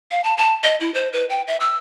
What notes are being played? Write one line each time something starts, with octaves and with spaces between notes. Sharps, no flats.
F5
A5
A5
D#5
E4
C5
B4
G5
E5
E6